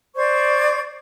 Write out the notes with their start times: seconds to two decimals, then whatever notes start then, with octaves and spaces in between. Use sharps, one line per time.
0.16 C5 D5 C#6 G#6